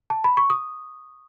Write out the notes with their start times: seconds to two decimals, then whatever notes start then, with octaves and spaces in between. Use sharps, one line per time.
0.10 A5
0.24 B5
0.37 C#6
0.50 D#6